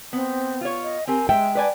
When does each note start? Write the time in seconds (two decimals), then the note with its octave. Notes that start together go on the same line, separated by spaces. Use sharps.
0.13 B3 C4
0.61 F4 C#5
0.83 D#5
1.07 C4 G4 A#4 G#5
1.29 G#3 E5 G5
1.55 B4 D5 G#5